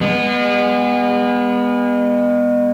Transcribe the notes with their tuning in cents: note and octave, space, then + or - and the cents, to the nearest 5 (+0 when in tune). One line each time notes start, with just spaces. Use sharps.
G#3 -40 B3 -10